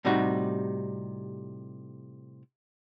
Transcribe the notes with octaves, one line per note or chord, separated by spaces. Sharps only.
A2 C3 G3 D#4 F#4